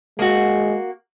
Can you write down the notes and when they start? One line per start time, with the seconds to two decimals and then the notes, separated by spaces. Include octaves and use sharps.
0.19 G#3 A#3 F#4